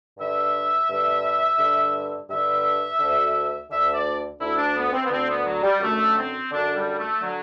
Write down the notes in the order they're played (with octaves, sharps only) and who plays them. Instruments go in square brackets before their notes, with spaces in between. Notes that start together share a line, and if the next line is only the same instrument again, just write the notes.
[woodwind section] G2 D3 E5
G2 D3
G2 D3
G2 D3 E5
D2 D3
D2 D3 E5
D5
D2 D3 E4
D4
B3
C4
B3
D2 D3 C4
B3
F#3
G3
F#2 D3 A3
C4
F#2 D3 D4
G3
A3
D3 F#3